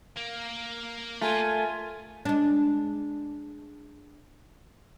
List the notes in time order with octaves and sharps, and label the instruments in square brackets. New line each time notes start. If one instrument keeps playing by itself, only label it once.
[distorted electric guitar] A#3
[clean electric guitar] A3 [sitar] F4 A#4 [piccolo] G#5
[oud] G#3 D4